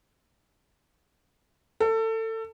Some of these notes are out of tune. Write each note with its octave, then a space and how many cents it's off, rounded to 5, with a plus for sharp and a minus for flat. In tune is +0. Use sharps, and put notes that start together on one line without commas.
A4 +25